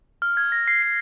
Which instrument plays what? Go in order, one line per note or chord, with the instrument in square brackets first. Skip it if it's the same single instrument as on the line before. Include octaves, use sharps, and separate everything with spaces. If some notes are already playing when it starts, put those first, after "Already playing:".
[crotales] F6
G#6
A#6
C7
C7